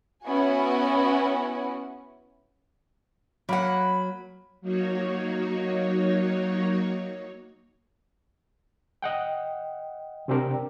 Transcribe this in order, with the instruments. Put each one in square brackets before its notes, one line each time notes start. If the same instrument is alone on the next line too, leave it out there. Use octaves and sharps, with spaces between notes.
[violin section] B3 C#4 E4 F#4 F#5 G#5
[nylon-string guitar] F#3 [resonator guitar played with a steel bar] A#3 F#5 [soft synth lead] B5
[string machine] F#3 A#3 D#4 F#4 C#5
[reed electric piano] D#5 F#5 G5
C3 C4 D4 G4 A#4